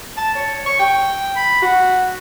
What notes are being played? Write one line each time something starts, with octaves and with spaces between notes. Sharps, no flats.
A5
C#5
C#6
G5
B5
F#4